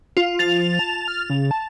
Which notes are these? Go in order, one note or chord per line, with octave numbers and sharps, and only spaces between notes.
F4
F3 A6 F7
A5
F6
C#3
A5